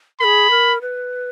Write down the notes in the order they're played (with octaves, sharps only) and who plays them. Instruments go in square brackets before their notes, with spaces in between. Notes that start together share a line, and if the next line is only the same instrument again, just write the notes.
[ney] A#4 [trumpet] B5
[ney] G#4
A#4
B4